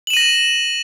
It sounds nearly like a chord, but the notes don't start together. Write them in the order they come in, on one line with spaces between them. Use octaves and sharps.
F#7 E7 D#7 A#6